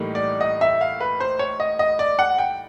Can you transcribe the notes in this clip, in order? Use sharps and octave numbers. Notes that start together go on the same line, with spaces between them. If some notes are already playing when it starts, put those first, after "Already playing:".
Already playing: A2 E3 G3 A#3 D#4
D5
D#5
E5
F5
B4
C5
C#5
D#5
D#5
D5
F#5
G5